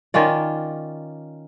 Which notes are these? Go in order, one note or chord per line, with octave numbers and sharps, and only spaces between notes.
D#3 C#4 F4 D5